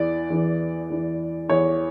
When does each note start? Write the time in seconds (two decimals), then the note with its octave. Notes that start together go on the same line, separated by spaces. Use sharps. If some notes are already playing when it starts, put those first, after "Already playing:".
Already playing: E2 E3 D5
0.30 E2 E3
0.90 E2 E3
1.49 E2 E3 C#5